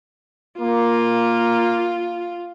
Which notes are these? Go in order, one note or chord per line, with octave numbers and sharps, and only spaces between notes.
A#3 F4